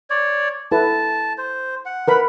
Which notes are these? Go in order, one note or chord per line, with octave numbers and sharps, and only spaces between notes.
C#5 D5
E4 A4 B4 A5
C5
F#5
A#4 B4 B5